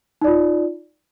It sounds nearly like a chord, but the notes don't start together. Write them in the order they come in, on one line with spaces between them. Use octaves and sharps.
D#4 D5 F4